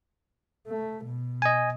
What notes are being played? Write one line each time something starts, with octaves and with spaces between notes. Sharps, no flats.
A3
B2
D#5 G#5